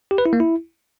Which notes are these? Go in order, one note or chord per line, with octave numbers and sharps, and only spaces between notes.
G4
B4
E4
A#3
E4